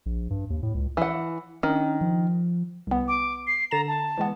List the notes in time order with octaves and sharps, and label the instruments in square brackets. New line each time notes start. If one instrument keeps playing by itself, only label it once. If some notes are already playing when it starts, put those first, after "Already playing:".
[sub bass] A#1
G2
D#2
A2
C#2
[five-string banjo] E3 F#5
[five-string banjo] D#3 [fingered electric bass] C#4 D4
[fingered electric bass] F3
[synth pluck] C2 B3
[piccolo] D6
C7
[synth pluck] D3 A6 E7 [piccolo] A#5
[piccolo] A5
[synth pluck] E3 G#3 B3